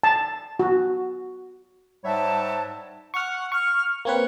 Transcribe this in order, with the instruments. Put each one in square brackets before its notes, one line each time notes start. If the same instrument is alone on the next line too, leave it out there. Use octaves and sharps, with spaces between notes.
[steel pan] A5
F#4
[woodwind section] G#2 G3 C#5 E5 F#5 A5
[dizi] F#5 [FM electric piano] C#6 F6
[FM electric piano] C#6 [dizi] F6
[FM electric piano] A#3 C4 B4 [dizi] C#5